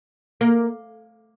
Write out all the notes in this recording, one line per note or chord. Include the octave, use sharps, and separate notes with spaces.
A#3